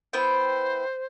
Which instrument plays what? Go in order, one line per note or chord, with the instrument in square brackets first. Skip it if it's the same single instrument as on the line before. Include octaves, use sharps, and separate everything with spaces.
[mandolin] B3 E4 G5 [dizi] C5